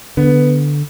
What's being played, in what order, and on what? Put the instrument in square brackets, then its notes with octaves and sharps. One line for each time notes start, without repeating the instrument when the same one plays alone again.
[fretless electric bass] D3 [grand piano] B3